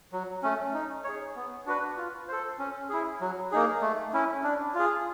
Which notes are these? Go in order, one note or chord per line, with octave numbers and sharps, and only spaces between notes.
F#3
A3 C#4
D#4
G#4 C#5
B3
D4 F#4 B4
F4
A4 C5
C#4
E4 G#4
F#3
A#3 D#4 G#4
A3
C#4 E4
D4
F4 G#4